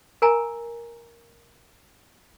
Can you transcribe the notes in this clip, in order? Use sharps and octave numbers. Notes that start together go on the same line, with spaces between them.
A#4 G#5 A#5